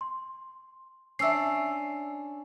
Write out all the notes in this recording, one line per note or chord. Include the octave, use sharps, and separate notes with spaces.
C6
C#4 D4 E5 E6 C7